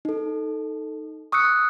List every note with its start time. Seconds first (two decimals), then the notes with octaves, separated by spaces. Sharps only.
0.05 D#4 A4
1.32 C#6 D#6 E6 F#6 C#7